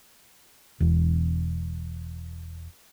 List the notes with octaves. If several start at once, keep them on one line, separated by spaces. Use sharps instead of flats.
E1 E2